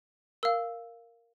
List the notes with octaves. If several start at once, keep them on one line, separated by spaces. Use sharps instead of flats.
A#4 F5 E6